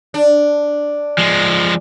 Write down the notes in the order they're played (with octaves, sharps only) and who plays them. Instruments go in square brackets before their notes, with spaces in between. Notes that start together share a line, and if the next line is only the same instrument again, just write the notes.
[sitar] D4
[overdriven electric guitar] F3 G#3